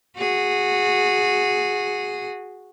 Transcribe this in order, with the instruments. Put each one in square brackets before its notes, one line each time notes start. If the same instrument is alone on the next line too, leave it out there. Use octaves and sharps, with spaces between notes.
[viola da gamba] F#4 G#4